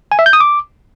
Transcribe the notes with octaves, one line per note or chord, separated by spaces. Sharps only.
G#5
E5
G6
D#6
D6